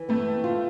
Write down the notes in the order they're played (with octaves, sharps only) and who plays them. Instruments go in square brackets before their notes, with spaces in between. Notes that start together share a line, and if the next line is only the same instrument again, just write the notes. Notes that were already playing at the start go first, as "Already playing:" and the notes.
Already playing: [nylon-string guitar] E3
[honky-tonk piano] A3 [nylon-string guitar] C4
[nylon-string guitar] F4